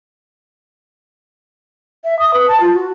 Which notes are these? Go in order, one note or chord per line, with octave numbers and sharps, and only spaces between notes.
E5
D#6
B4
A5
F4
F#4